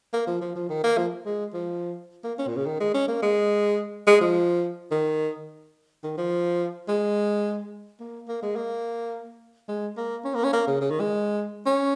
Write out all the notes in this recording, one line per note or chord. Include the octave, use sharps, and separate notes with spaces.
A#3
F3
F3
F3
D#3
A#3
F3
G#3
F3
A#3
C#4
A#2
C#3
D#3
G#3
C#4
A#3
G#3
G#3
F3
D#3
D#3
F3
G#3
A#3
A#3
G#3
A#3
G#3
A#3
C#4
A#3
C#4
A#3
C#3
C#3
D#3
G#3
C#4